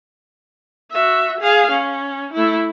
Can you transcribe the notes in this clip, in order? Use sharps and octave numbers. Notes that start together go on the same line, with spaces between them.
F#4 E5
G#4 F5
C#4
A3 E4